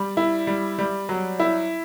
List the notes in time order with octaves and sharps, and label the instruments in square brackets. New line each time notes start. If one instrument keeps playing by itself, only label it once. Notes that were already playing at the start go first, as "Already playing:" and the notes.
Already playing: [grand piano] G3
E4
G3
G3
F#3
E4